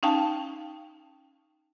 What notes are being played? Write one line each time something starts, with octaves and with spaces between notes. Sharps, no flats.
C#4 D#4 F5 G5 A5